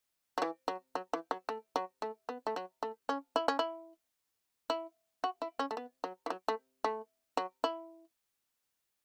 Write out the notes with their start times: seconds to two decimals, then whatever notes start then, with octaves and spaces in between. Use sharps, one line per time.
0.38 F#3
0.42 E3
0.68 F#3
0.95 F#3
1.13 E3
1.31 F#3
1.49 A3
1.76 F#3
2.02 A3
2.29 B3
2.47 A3
2.56 F#3
2.83 A3
3.09 C#4
3.36 E4
3.48 C#4
3.59 E4
4.70 E4
5.24 F#4
5.42 E4
5.59 C#4
5.71 A3
5.77 B3
6.04 F#3
6.26 E3
6.30 F#3
6.48 A3
6.84 A3
7.37 F#3
7.64 E4